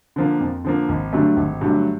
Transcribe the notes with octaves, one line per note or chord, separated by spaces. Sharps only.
D3 F3 A#3
F2
D3 F3 A#3
G#1
G2 D3 F#3 A3
G#1
G2 D3 F#3 A3